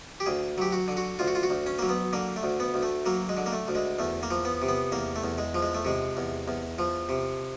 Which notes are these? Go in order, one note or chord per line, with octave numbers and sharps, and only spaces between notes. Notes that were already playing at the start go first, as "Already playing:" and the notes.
G4
D2 G#4
F#3 G4
F#4
D3
F#4
D2 F4
F#4
F4
F#4
D2
C#4
F#3 A#3
B3
D3 A#3
A3
D2
B3
D2
A3
F#3 A#3
G#3
D3
A#3
A3
D2
G#3
E2 A3
A#3
F3
B3
C3
B3
E2 A#3
A3
E2
G#3
F3
G#3
A3
C3 G#3
E2
E2
F3
C3